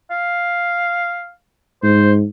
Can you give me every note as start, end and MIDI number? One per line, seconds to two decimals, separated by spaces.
0.11 1.32 77
1.83 2.25 44
1.83 2.12 72